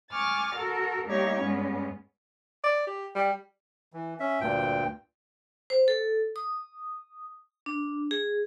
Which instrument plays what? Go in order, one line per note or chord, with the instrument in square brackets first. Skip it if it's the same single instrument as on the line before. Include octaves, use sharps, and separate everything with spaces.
[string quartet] G#5 C#6 D6 F6 A6
F#4 A4 A#4
G3 A3 A#3 D#4 G4 C#5
G2 G3 G#3 B3 C#4
[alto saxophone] D5
G4
G3
[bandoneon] E3
C#4 E5
D2 G2 A#2 G5
[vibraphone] C5
A4
D#6
D4
G#4